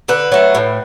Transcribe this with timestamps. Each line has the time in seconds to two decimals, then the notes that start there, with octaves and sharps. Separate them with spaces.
0.08 D3 B4
0.32 F#3 A3
0.55 A2